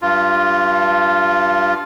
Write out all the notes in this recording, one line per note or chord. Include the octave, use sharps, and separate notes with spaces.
G2 F4